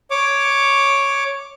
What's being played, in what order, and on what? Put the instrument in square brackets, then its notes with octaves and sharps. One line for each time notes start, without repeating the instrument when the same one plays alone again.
[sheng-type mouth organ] C#5 D6